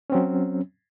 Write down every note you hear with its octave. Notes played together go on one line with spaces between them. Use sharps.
F#3 C4 C#4